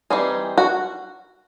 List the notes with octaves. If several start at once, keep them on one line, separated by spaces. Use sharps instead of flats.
E3 G3 C4 D#4 G#4
F#4